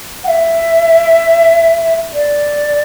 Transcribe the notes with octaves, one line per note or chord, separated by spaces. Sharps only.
F#5
E5
D5